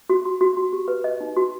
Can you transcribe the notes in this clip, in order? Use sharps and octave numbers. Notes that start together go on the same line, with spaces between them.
F#4
F#4
F#4
F#4
G4
B4
D#5
D#4
F#4